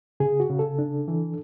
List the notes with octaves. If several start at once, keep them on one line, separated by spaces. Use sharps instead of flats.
C#3 G#4
F#4
C#3
A4
D4
E3